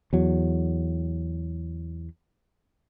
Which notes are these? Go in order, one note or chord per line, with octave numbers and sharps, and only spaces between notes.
E2 F#3